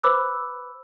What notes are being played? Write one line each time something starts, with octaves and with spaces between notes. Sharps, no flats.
B4 C5 B5 D6 E6 F#6